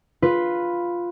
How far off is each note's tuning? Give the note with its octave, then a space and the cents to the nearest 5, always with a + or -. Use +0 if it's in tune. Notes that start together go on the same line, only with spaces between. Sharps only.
F4 +0 B4 +0